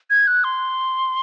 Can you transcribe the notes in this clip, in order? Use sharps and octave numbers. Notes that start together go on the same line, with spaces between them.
G#6
F#6
C6